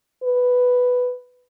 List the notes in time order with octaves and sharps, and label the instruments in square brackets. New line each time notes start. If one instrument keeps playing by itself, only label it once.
[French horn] B4